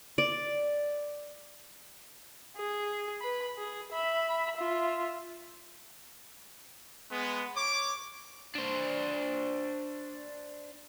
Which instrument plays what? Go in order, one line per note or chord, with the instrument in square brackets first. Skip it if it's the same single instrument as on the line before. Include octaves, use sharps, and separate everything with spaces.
[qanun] D5
[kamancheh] G#4
B4 B5
G#4
E5 B5
F4 E5
[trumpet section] G#3 B3
C#5 D6
[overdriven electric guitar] D4 C5